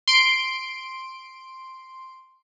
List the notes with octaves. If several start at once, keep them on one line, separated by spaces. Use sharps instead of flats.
C6 D7